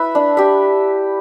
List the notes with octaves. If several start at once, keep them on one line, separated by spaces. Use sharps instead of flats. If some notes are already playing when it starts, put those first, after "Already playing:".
Already playing: E4 B4 E5
D4
G4 E5